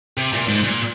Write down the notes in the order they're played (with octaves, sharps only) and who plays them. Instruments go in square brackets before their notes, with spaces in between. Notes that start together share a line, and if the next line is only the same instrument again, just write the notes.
[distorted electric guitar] C3
A#2
G#2
A#2